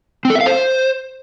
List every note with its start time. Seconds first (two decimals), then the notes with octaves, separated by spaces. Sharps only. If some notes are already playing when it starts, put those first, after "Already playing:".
0.25 C4
0.30 A4
0.35 E5
0.41 F5
0.46 C5